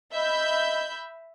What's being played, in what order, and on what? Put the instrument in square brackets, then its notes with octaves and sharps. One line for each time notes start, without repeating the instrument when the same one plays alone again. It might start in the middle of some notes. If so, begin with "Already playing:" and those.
[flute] D#5 [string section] E5 B5 G6